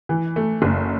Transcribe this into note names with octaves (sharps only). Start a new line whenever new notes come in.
E3
A3
F#1